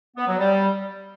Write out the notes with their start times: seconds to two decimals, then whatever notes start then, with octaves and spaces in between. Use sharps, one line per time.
0.17 B3
0.28 F#3
0.38 G3